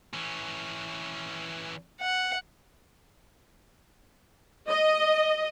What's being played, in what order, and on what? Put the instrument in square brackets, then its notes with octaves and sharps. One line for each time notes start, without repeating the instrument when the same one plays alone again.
[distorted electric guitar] E3 C#4
[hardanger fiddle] F#5
[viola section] D#5